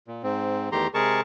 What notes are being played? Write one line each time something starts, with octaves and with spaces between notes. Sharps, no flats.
A#2
G#2 C4
E2 D#3 A3 G4 A#5 C6
C3 G#3 G#4 A#4 A5 C#6